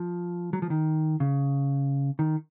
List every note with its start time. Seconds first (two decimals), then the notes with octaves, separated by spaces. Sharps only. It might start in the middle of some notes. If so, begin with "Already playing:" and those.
Already playing: F3
0.53 F#3
0.62 F3
0.70 D#3
1.20 C#3
2.19 D#3